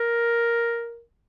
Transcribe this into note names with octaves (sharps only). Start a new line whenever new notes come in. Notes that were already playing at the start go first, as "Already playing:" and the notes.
Already playing: A#4